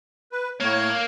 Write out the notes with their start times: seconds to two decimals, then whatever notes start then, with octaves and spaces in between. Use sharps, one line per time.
0.32 B4
0.60 A2 A#3 C#5